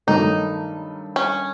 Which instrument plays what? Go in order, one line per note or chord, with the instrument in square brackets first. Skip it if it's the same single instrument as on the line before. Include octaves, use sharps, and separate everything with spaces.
[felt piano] G2 D#3 F#3 A3 [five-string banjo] D#4
[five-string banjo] C#4